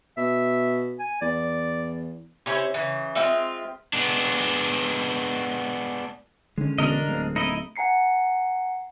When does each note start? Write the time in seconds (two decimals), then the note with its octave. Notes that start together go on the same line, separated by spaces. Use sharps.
0.17 B2 E5
1.00 G#5
1.21 E2 D5
2.46 C3 C#4 E4 C5
2.74 C#3 E3
3.15 G#3 C4 F4 E5
3.93 G#3 B3 D4
6.58 D3 D#3 G#3 C#4
6.78 E1 D3 D4 A#4 D#5
7.08 D1 G#3 A#3 C4
7.36 D#4 E4 D#5
7.76 F#5 G#5 A#5 C7 C#7